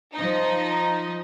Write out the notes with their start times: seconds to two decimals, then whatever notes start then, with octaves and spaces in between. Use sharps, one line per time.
0.15 F3 D#4